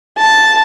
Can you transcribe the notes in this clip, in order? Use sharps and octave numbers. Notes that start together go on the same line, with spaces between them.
A5